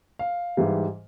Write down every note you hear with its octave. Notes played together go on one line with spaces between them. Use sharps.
F5
G#2 E3 G3